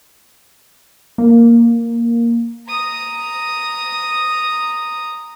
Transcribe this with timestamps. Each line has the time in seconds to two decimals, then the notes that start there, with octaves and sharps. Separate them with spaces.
1.18 A#3
2.68 A#5 D#6